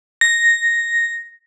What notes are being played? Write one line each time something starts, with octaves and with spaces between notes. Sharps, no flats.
A#6